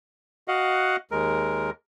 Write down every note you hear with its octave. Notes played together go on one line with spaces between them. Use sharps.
F#4 D#5 F5 F#5
D#2 G#3 A#4